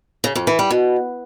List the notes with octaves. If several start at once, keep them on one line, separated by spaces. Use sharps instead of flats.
C#3
F2
E3
G3
B2